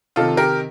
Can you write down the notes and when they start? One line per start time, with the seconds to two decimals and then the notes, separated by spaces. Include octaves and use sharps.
0.16 C3 D#3 F4 A4
0.37 G4 A#4